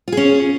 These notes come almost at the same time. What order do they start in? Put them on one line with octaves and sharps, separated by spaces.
F4 G#4 C#4